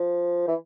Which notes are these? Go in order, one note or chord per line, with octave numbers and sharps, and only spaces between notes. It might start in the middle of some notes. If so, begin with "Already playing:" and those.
Already playing: F3
E3